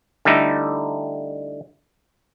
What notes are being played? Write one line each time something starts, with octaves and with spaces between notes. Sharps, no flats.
D3 G3 A3 D#4 E4